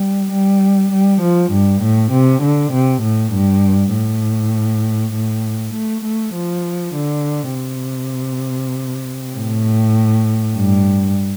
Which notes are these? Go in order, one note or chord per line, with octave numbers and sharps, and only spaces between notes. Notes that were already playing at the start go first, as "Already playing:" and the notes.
Already playing: G3
G3
G3
F3
G2
A2
C3
D3
C3
A2
G2
A2
A2
A3
A3
F3
D3
C3
A2
G2